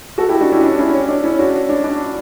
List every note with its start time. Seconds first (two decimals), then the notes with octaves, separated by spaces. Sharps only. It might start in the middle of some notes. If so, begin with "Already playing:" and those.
0.18 F#4 A4
0.29 E4 G4
0.41 D4 F#4
0.52 C#4 E4
0.63 D4
0.78 C#4 E4
0.93 C#4
1.09 D4
1.23 C#4 E4
1.39 D4 F#4
1.69 D4
1.84 D4